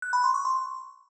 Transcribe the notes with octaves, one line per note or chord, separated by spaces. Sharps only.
F#6
B5
C6
C#6
C6